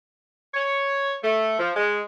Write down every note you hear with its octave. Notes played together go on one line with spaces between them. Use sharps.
C#5
A3
F3
G#3